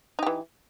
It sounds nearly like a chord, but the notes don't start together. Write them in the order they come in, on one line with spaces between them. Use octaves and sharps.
D#4 G4 E3